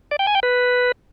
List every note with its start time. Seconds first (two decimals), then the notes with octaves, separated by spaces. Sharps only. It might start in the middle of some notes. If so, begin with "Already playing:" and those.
0.11 D5
0.19 G5
0.27 G#5
0.35 G5
0.43 B4